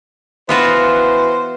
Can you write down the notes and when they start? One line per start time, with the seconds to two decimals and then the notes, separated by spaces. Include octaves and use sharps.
0.49 E3 B3 F4 F#4 C5